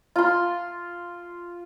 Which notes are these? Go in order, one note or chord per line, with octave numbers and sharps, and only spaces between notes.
F4 C6